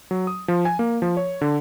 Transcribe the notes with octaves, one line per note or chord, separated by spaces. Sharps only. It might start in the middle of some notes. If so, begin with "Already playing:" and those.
F#3
D#6
F3
G#5
A#3
F3
C#5
D3